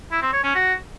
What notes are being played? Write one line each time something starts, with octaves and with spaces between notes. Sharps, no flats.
E4
C4
C#5
C#4
F#4